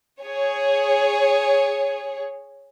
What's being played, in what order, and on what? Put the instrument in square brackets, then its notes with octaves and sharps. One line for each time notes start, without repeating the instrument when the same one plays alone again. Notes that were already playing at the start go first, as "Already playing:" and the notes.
[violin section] G#4 C#5